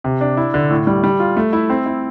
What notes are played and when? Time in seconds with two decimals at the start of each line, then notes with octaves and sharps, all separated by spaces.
0.04 C3
0.21 D4
0.37 E4
0.54 D3
0.70 A2
0.87 G3
1.04 G3
1.20 F4
1.37 A3
1.53 E4
1.70 C4
1.86 E4